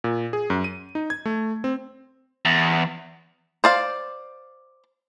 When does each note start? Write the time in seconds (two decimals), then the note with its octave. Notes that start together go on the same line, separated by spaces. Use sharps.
0.04 A#2
0.33 G#4
0.50 F#2
0.64 D#7
0.95 D#4
1.10 G#6
1.25 A3
1.64 C4
2.45 E2
3.64 C5 D5 F5